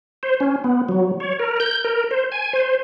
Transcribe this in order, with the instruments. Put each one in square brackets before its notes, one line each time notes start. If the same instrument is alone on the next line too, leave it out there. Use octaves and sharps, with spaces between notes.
[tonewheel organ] C5
C#4
B3
F#3
C#5
A#4
G6
A#4
C5
G#5
C5